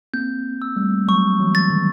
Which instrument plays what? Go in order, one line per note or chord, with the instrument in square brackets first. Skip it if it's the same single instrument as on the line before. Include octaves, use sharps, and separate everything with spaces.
[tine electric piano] A#3 C4 [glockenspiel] G6
[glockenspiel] E6
[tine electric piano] G3 A3
[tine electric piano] F#3 G#3 [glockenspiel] C#6
[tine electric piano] E3 F#3
[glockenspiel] A6
[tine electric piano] D#3